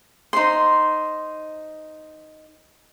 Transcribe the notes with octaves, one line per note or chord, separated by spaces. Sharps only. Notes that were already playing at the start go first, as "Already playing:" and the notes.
D#4 C5 C6